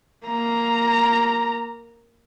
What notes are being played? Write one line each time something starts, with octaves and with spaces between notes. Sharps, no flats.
A#3 A#5